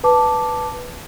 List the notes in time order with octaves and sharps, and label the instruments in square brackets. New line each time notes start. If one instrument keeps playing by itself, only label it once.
[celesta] B4 A5 D6